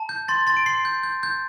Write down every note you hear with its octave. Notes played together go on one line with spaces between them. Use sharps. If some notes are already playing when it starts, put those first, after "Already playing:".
Already playing: A5
G6
C6 A6
C6 A6
D7
C6 C7
G6
G6
G6